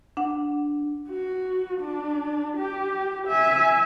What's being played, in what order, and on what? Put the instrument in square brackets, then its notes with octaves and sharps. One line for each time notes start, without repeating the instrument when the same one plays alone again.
[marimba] D4 F#5
[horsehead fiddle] F#4
D4
G4
E5 G#5